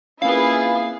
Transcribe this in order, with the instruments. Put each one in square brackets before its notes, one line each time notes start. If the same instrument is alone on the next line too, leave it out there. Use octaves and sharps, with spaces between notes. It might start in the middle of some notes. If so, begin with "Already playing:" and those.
[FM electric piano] A#3 C4 C#4 [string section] E4 G#4 [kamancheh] F4 B4 [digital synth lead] F5